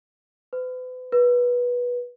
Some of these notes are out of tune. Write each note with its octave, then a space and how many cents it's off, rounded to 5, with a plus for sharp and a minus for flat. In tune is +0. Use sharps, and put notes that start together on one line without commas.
B4 +40
B4 -20